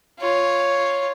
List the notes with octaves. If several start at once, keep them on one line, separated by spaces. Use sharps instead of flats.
F4 C#5